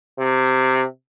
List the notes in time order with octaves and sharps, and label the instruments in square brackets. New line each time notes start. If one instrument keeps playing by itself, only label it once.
[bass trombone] C3